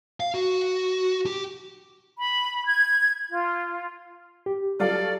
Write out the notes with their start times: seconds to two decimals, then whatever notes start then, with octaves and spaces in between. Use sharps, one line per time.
0.20 F5
0.35 F#4
1.26 G4
2.18 B5
2.66 G#6
3.30 F4
4.46 G4
4.80 F#3 F4 A4 D5